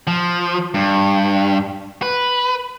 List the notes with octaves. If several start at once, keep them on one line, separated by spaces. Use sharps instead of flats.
F3
G2
B4